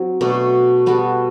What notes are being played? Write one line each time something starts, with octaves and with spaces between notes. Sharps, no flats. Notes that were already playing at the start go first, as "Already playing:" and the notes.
Already playing: F#3 C4
B2 A3 D4
G3 B3 F#4 A4